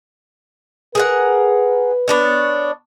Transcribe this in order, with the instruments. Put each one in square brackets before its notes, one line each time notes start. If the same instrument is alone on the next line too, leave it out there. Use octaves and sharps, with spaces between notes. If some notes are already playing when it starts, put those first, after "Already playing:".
[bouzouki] G#4 A#4 F#5 [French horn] B4
[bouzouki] B3 D4 C#5